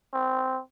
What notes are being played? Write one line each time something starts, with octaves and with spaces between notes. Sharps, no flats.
C4